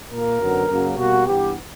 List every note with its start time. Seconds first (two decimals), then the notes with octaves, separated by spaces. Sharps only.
0.09 A#2 A#3 A#4
0.38 F#2 D3 F#3 B3
0.68 F#2 C#3 F#3 A#3
0.96 B2 G3 A#3 F#4
1.25 G2 E3 B3 G4